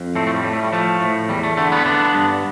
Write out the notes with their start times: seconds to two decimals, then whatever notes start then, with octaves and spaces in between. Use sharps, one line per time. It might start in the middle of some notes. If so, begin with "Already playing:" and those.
Already playing: F2
0.15 A2 A3 C4
0.27 A3
0.35 G3
0.44 A2
0.53 A3
0.63 G3
0.72 F3 A3
1.00 A2
1.29 E2 G3
1.43 A3
1.57 D3 A3
1.71 G3 B3
1.86 D3 B3 D4
2.14 G2